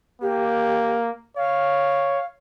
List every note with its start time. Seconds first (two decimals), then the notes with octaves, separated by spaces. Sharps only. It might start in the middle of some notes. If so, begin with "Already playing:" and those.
0.22 A#3 G4
1.37 C#5 F5